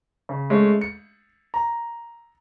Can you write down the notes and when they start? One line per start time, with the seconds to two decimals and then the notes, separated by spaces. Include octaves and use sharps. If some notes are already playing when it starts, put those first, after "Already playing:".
0.29 C#3
0.50 G#3 A3 C#4
0.81 C#7
1.54 A#5